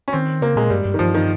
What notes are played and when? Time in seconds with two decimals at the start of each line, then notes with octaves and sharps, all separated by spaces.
0.08 C#4
0.13 D#3 C4
0.42 C#3 A#3
0.56 A#2 G#3
0.70 G2 G3
0.85 G2
0.94 D#3
0.99 G2 F3
1.14 D#3